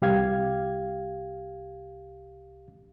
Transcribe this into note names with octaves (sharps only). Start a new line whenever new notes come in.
C2 G4 F5 G#6